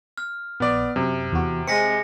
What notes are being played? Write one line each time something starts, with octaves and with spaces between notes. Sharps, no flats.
F6
A#1 B3 D5
F#2 C3
E2 F#4
G#3 C4 A#6 B6 C#7